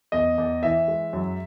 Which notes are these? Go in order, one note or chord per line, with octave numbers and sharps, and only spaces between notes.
E2 D#5
E2
E3 E5
G#3
F#2